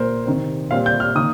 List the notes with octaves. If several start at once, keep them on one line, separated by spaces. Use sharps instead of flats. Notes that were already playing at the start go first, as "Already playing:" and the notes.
Already playing: A#2 A#3 A#4 C5
C3 D#3 C4
A#2 G3 C4 F5
G6
F6
D#3 A#3 D#6